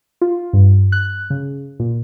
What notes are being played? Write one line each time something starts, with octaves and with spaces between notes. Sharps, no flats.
F4
G2
F#6
C#3
A#2